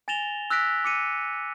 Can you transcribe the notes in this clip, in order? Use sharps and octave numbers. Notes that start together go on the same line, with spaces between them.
G#5 A6 A#6 E7 F7 G7
E6 F#6 A#6 B6 D7
D6 C#7 D#7